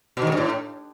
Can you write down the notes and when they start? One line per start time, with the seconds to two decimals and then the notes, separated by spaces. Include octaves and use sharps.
0.17 B2
0.22 D#3
0.27 G#2
0.32 G2
0.37 A2